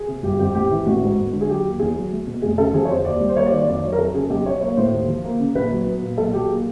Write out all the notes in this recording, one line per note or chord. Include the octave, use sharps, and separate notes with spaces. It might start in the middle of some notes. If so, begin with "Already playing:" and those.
Already playing: G#4
C3
G1 G4
F2 G4
A1 G4
E3
A1 F#4
G#2
E1
D3
G#4
F#3 G4
D#2
E2 G#4
F#3
A3
B2
F1 G#4
C#3 A4
F3 G#4
C#5
F2 C5
D#2 D5
G3
C5
A#3 C#5
D5
D#3
D5
F2 D5
F#3 C#5
A#4
F2 A4
C#3 G#4
B1 G4
F#3 C#5
A#3 C#5
A2 C5
D#2
F3
A#3
C#3
A#1 B4
F#3
B3
A#2
B1 A4
F#3 G4
A#3 G#4